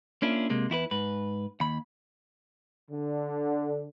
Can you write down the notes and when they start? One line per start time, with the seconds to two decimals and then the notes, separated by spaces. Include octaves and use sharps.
0.22 A#3 C#4 D4 E4 F4
0.50 C3 G#3 A#3
0.70 E2 E4 F#4 B4
0.91 G#2 B4
1.60 D#2 B5
2.90 D3